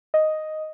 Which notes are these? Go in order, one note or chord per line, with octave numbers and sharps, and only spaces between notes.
D#5